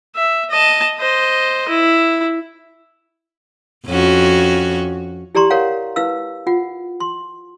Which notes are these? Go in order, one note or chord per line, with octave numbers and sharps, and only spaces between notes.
E5
D#5 A5
C5 D#5
E4
F2 C#4 F#4
E4 G4 D5 A#5 C6 C#6
A#4 C#5 F5 F#5
E4 B4 F5 E6
F4 F#5
C6